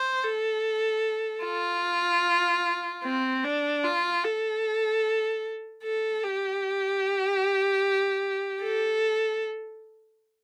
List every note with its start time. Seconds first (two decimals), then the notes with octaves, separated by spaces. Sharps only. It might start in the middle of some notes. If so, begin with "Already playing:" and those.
Already playing: C5
0.24 A4
1.44 F4
3.04 C4
3.44 D4
3.83 F4
4.24 A4
5.83 A4
6.23 G4
8.62 A4